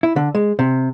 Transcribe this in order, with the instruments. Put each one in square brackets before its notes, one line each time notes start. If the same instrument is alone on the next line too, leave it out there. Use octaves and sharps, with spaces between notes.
[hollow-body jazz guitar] E4
D3
G#3
C3